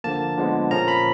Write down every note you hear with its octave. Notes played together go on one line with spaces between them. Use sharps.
D3 F3 A#3 A5
D3 F3 G#3 B3
A#2 F3 A#3 C#4 A#5
B5